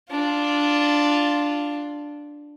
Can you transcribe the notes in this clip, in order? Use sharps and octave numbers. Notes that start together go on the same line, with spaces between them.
D4 F4